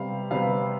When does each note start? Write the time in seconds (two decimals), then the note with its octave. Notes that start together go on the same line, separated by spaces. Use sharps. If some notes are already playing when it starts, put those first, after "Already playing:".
Already playing: C3 G3 B3 F5
0.31 C3 G3 B3 F5